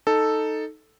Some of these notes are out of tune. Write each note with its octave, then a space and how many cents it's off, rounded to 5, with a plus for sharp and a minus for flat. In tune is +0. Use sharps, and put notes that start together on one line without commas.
D#4 +0 A4 +0